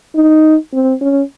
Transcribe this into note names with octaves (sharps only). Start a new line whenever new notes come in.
D#4
C4
C#4